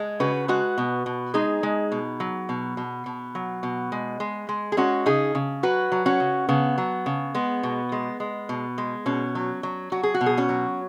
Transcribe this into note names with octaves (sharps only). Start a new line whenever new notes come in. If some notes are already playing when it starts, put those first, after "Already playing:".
Already playing: G#3
C#3 F#4 B4
G#3 F#4 B4
B2
B2
G#3 D#4 G#4
G#3
B2
F#3
B2
B2
B2
F#3
B2
G#3
G#3
G#3
G#4
G#3 C#4 F#4
C#3 D#4 G#4
C#3
F#3 F#4 B4
F#3
C#4 F#4
C#3
C#3 B3
F#3
C#3
G#3 B3
B2
G#3
G#3
B2
G#3
B2 C#4
F#3
F#3
F#3 F#4
G#4
F#4
B2
G#4
C#4 F#4
F#3